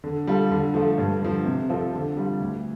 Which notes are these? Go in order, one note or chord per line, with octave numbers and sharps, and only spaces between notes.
D3
G3 F4 A4
D3
F3 A3 F4 A4
G2
D3 F3
C3
F3 C4 F4 A4
D3
G3 F4
D2